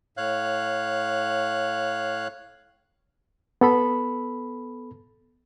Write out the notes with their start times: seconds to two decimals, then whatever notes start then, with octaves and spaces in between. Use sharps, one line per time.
0.17 A2 C#5 F5 F#6
3.61 B3 A4 B5